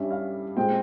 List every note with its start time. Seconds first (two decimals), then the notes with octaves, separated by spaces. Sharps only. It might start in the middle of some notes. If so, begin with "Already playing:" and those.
Already playing: G2 G3 C#4 E5
0.11 F5
0.56 A#2 G#3 C4 G5